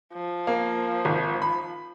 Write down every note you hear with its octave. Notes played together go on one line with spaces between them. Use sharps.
F3
A#3
G#1
B5